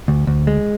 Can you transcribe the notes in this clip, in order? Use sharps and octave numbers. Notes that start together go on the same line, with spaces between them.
D2
D2
G#3